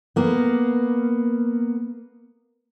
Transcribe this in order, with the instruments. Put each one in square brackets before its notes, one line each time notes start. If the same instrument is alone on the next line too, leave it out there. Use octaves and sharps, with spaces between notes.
[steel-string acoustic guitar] A#3 B3